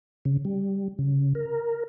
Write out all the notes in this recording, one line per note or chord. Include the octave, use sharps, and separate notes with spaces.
C#3
G3
C#3
A#4